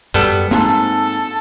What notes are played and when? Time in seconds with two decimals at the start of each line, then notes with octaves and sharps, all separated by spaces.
0.14 F#2 G3 B3 A4
0.51 G#2 A#3 C4 A4